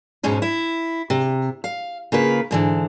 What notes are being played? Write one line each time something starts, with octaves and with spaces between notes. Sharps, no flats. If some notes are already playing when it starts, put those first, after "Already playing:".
G#2 B2 G#3 C#4 D#4
E4
C3
F5
C#3 A#3 F4 B4
G#2 D3 E3